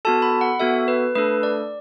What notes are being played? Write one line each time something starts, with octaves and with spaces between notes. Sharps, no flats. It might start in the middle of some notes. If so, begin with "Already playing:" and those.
B3 F#4 A4 A5
B5
F#5
B3 F#4 A4 E5
B4
A3 D4 A4 B4
D5